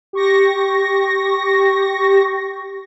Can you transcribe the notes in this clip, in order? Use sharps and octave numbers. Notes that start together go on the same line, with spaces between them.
G4 C#6 A#6